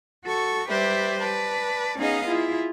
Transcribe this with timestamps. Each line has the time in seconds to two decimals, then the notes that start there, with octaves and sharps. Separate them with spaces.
0.23 F#4 A4 C#6
0.67 G3 G4 B4 C5 D5 E5
1.19 B4 D5 A5
1.97 B3 C#4 D#4 G#4 D#5 F5
2.26 E4 F4 G#4